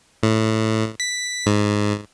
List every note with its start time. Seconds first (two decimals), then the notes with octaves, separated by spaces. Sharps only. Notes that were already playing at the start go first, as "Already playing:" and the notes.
0.23 A2
1.00 B6
1.46 G#2